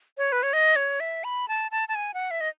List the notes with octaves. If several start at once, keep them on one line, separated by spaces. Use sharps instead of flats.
C#5
B4
C#5
D#5
C#5
E5
B5
A5
A5
A5
G#5
F#5
E5
D#5